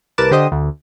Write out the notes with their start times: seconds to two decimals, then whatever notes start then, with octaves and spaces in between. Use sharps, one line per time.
0.18 C2 A#4 B4 A5 D6 E7
0.31 D3 G4 C5 D#5 D#6
0.52 D2